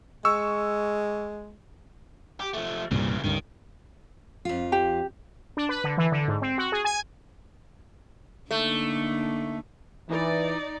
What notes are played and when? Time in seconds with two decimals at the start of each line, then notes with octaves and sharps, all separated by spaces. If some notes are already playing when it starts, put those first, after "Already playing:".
0.25 G#3 C#6 E6
2.40 G4
2.54 F3 A3
2.91 C2 G2 A#2 C#3 E3
3.24 C#2 G2 D#3
4.45 F2 F4
4.72 G4
5.57 D4
5.69 B4
5.84 D3
5.98 E3
6.12 D3
6.28 G#2
6.42 C4
6.58 F#4
6.72 G#4
6.85 G#5
8.51 D3 A3 A#3 D#4
10.09 E3 D#4 D5